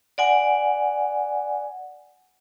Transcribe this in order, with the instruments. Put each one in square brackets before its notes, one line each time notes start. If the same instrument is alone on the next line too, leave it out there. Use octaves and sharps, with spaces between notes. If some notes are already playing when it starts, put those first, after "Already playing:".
[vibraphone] D5 F#5 G#5